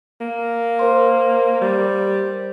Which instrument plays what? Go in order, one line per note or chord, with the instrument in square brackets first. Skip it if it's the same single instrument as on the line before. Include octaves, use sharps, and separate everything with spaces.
[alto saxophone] A#3
[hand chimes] A#4 C5 C6
[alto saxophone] G3